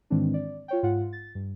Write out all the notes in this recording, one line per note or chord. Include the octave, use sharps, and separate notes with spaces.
G#2 D#3 E3 G#3 C4 D4
D5
F4 C#5 G5
G#2 F4 F#5
A6
G2